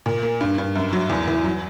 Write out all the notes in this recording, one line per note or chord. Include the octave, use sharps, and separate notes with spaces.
A#2
A#3
G2
G2
F#2
F#3
E2
E3
F#3